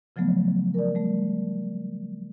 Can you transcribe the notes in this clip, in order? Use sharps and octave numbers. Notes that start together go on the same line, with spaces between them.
C#3 F3 F#3 A3 B3
A#4 D5
G3 A3